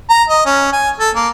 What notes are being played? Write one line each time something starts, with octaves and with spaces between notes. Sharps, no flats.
A#5
D#5
C#4
G#5
A4
A#3